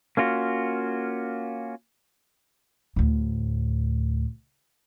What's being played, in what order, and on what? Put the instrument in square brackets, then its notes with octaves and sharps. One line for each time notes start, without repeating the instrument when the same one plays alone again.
[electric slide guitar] A#3 C#4 F4 F#4
[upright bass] D2 A2